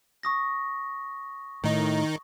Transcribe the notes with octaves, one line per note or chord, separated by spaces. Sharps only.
C#6 D#6 A#6
A2 D#3 D#4